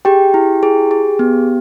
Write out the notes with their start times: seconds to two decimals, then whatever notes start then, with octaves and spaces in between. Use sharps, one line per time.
0.05 G4 G#4 G5
0.34 E4
0.63 G#4
0.91 G#4
1.19 B3